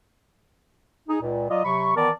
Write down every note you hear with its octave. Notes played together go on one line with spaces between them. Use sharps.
D#4 G#4
C#2 A#2
F#3 F4 D5 D#5
C3 F#3 B5 C#6
D#3 E3 B3 A#4 D5 A5